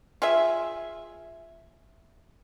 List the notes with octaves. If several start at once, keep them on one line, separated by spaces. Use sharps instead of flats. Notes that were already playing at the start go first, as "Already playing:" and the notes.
F4 G#4 E5